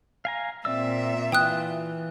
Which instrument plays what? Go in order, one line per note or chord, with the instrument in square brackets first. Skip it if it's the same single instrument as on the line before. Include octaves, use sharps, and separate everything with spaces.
[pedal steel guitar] F5 G#5 A#5
[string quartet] A#2 E5 [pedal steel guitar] C4 D5 E6
[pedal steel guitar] E3 F4 [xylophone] G5 D#6 F#6